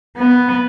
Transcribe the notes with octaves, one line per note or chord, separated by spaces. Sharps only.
B3